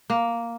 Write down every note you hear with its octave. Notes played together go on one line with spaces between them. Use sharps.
A#3